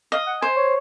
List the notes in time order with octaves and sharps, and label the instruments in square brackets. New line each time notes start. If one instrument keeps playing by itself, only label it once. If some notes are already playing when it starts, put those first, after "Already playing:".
[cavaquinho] D#5 [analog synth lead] F5
[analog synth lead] F#5
[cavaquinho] C5 [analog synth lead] G#5
[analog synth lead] C#5